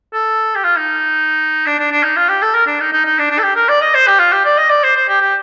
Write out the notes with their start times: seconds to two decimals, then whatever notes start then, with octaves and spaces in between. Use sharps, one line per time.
0.13 A4
0.55 G4
0.64 F4
0.76 D#4
1.66 D4
1.79 D4
1.91 D4
2.03 D#4
2.16 F4
2.29 G4
2.42 A4
2.54 A#4
2.66 D4
2.80 D#4
2.93 D#4
3.05 D#4
3.18 D4
3.30 D4
3.38 A4
3.43 G4
3.56 A#4
3.68 D5
3.81 D#5
3.94 C5
4.07 G4
4.19 F4
4.32 G4
4.45 D5
4.58 D#5
4.70 D5
4.83 C5
4.96 C5
5.08 G4
5.21 G4